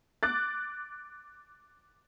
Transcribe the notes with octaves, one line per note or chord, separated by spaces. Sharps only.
D6 F#6 A6